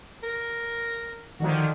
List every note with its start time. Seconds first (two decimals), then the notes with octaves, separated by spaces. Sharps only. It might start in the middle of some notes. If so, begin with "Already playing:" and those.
0.23 A#4
1.40 D3 D#3 F3 F#4